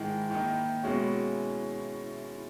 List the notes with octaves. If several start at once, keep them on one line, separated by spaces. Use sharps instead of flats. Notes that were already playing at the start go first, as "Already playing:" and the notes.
Already playing: G#2 D#3 G#3 E4
D#3 A#3 D#4
B2 G#3 C#4 E4 F#4